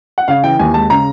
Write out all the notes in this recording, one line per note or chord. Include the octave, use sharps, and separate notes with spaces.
F#5
C#3 F5
E3 G5
D#2 G#5
G#3 A5
C#3 A#5